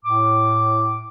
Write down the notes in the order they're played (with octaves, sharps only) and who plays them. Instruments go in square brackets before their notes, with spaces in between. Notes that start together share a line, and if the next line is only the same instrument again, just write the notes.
[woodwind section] A2 D6